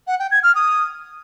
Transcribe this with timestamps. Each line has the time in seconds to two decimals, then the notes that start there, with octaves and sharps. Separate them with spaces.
0.07 F#5
0.19 G5
0.31 G#6
0.43 F6
0.55 D#6